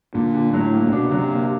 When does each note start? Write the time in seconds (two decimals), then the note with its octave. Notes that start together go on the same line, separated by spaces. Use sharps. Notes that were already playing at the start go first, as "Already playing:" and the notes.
0.14 A#2 D3
0.34 D3
0.53 A2 F#3
0.73 A#3
0.86 A#2
0.92 B2 D4
1.10 C#3 F#3
1.18 C3
1.31 A#3